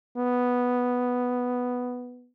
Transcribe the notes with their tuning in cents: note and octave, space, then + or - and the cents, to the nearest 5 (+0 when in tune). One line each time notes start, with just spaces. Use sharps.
B3 +0